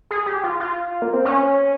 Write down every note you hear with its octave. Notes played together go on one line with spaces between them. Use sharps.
G#4
G4
F4
F4
A#3
C4
C#4